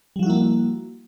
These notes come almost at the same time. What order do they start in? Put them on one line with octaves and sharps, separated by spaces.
G3 F3 F#4 E4 A#3